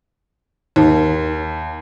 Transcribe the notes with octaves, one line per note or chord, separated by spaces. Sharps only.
D#2